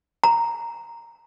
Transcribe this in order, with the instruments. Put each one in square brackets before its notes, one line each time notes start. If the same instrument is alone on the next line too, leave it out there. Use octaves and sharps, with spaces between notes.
[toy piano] A#5